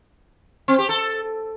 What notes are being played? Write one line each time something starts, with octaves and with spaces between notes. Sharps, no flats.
C4
G4
A4